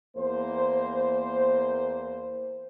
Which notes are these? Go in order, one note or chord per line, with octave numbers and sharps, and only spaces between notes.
E2 A#3 C5